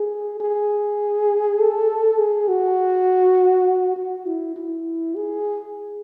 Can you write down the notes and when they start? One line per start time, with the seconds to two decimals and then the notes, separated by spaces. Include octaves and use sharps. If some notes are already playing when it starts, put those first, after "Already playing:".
Already playing: G#4
0.40 G#4
1.60 A4
2.18 G#4
2.48 F#4
3.97 F#4
4.26 E4
4.56 E4
5.15 G#4